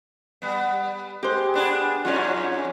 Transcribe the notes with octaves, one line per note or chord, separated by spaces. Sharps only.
G3 B3
G#3 G4 C5
B3 D4 G#4
F2 G#2 C#4 F4 F#4 D5